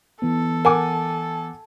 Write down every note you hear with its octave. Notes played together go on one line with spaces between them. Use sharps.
E3 B3 A4
A#4 F#5 G#5 D6